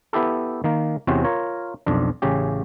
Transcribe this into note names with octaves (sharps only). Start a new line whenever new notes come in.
B3 E4 G4 A4
D#3 A#3
E2 C3 C4 C#4 F#4 C5
F4 A#4 C#5
B1 F2 D4
A1 C#3 C#4 G4